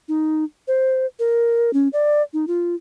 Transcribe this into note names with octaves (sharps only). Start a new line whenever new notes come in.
D#4
C5
A#4
C#4
D5
D#4
F4